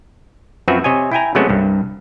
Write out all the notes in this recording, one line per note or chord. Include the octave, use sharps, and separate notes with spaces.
F#2 F3 C4 F#4 B4 E5
C3 C#5 D#5 G#5
E4 G5 G#5 A#5
C3 F#3 G#3 A3 B3 C#4
C2 G2